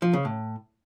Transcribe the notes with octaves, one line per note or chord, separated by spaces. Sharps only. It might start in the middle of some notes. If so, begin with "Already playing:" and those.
F3
C#3
A2